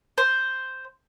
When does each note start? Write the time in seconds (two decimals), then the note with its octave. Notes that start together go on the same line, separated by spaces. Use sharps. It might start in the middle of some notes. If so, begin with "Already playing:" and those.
0.18 C5